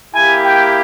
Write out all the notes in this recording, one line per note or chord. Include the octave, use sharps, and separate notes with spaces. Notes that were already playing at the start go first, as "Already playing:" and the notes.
A#3 E4 G4 G#5
G5